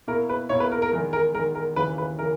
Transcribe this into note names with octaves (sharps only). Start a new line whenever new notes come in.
B2 A#3 E4 A#4
B4
B2 A#3 E4 C#5
B4
A#4
A#4
E2 D#3 G#3 A#4
A#4
E2 D#3 G#3 A#4
A#4
D#2 C#3 E3 A#3 B4
B4
C#3 E3 A#4